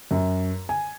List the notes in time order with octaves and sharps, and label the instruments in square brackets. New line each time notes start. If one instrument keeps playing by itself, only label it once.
[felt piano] F#2
G#5